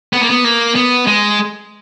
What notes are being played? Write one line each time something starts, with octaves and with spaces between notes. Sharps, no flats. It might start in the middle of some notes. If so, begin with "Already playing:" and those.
B3
A#3
B3
A#3
B3
G#3